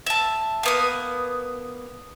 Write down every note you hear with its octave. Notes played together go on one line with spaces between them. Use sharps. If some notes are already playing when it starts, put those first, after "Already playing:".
E5 A5
A#3 B3 D#6